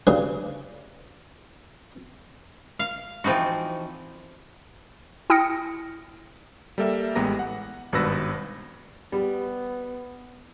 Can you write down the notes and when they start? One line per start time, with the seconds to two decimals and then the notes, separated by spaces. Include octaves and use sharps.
0.07 D2 G2 C#3
2.79 F5
3.24 E3 F3 C4 D#4 F#4
5.30 E4 G5 D#6 F6 A#6 C#7
6.78 G3 A#3 A4 A#4 E5
7.15 A1 G#3 B3 G4 A#5 A#6
7.39 F#5
7.93 G#1 G2 B2 B4 E6 A#6
9.12 G3 B3